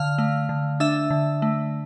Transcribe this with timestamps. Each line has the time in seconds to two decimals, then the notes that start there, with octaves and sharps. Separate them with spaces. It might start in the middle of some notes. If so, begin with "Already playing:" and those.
Already playing: D3 F5 F6
0.18 A3
0.49 D3
0.80 D4 E5 E6
1.10 D3
1.42 A3